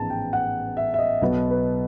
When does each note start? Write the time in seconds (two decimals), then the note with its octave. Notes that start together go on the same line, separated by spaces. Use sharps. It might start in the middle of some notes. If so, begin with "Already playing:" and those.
Already playing: A1 G#2 F3 G#3 B3 A5 A#5
0.10 G5
0.33 F#5
0.77 E5
0.94 E5
0.99 D#5
1.21 B1 B2 F#3 B3
1.51 B4